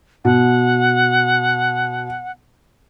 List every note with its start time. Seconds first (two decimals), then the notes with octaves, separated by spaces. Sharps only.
0.25 B2 F#5